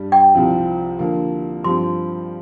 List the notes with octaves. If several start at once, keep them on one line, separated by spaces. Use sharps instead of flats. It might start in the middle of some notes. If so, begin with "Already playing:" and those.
Already playing: G2 G3 D4 G4
G5
C2 C3 F3 C4 F4
D3 F3 A#3
G2 F3 C4 C6